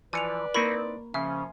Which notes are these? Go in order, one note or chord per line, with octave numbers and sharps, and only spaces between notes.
E3 F3 B4 D5 G#5 C#7 F7
A#3 C4 D#4 E4 A#4 B5 C#6
C#3 F3 C#4 E5 G#5 C6